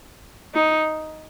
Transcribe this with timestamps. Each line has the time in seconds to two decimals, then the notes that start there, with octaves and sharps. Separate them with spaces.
0.54 D#4